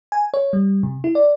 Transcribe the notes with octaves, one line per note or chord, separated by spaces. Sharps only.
G#5
C#5
G3
C3
E4
D5